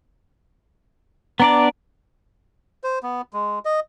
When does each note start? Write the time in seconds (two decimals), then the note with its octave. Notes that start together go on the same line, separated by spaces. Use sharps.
1.40 B3 D4 D5 A#5
2.84 C5
3.03 B3
3.33 G#3
3.65 D#5